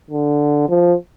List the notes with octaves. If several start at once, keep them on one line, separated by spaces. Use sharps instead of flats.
D3
F3